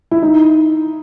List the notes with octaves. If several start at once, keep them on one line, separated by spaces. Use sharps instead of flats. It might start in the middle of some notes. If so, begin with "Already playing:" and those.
E4
D#4